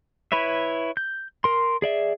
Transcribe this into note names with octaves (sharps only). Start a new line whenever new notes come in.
E4 B4 C#5 E5
G6
A#4 C6
G#4 D5 E5